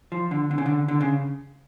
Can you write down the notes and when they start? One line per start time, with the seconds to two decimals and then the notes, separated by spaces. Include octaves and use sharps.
0.12 F3
0.31 D3
0.51 D3
0.58 C#3
0.66 D3
0.88 D3
1.01 C#3